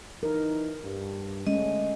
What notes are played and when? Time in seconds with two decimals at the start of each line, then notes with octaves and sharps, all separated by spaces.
0.23 E3 D#4 A#4
0.83 G2
1.47 D3 G#3 A3 C#4 D#5